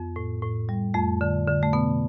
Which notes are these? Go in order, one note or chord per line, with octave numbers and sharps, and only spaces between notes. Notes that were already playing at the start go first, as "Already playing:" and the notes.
Already playing: F2 B3
A2
A2
G3
F2 A3
D3
D3
A3
B2 B3